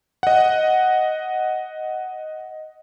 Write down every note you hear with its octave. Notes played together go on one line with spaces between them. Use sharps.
D#5 F#5